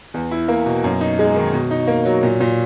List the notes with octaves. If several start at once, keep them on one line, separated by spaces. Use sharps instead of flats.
E2
E4
A#3
B2
F#2
D#4
G#3
D#3
B2
D#4
A#3
F#3
A#2
A#2